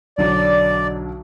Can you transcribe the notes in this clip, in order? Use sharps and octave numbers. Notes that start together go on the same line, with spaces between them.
B1 D3 F#3 D5